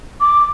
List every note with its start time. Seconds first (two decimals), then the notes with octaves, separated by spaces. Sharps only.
0.21 D6